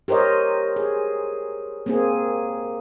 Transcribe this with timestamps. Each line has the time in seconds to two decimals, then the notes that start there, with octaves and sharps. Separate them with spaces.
0.08 G4 A#4 C5 C#5 D#5
0.76 G#4
1.86 A#3 C4 G#4